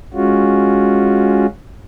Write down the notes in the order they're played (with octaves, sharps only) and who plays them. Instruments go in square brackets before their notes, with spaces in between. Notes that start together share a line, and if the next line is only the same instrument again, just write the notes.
[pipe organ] G#3 C#4 F4 F#4